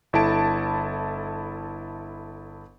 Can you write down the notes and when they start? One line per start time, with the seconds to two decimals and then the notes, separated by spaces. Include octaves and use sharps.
0.13 G1 E4 A4 A5 D7